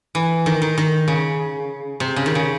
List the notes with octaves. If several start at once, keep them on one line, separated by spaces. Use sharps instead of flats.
E3
D#3
D#3
D#3
C#3
C3
C#3
D#3
C#3